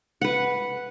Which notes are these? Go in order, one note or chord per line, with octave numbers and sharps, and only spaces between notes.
B4 F#5